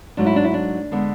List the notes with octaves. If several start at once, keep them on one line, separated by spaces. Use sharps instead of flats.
G#2 F#3 A3 D4
E4
D4
E4
D4
D3 G#3 B3